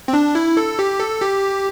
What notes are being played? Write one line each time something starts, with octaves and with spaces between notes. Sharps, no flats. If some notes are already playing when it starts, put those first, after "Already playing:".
C4
D4
E4
A4
G4
A4
G4